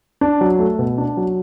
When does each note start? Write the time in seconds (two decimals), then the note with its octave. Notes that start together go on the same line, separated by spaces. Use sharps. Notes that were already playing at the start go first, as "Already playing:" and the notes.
0.21 D4
0.41 F#3
0.59 A3
0.79 B2
0.98 D4
1.17 F#3